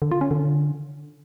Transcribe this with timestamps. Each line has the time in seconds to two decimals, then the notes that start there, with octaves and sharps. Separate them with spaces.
0.02 D3
0.11 F4
0.21 C#4
0.31 D3